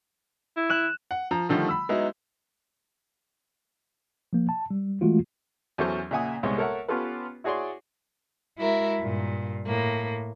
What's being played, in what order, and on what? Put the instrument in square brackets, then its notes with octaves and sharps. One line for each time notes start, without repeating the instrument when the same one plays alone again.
[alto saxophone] E4
[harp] F#6 E7
[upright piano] F#5
F3 A#5
D3 D#3 F3 G3 A3
B5 E6
F#3 G#3 B3 D#4 E4
[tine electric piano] F3 A#3
A5
G3
E3 G#3 A3 F4 F#4
[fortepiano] E2 F#3 C#4 A4 C5 C#6
A#2 C#3 E5 F#5 G#5 D#6
C2 G#2 G#3 B3 C#5
A4 A#4 C#5 E5 F#5
B3 C#4 F4 G4 A4 B4
E4 F#4 G#4 C#5 D5 C6
[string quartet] G#3 E4 F#4 A#4 E5
G2 A#2
A2 A#3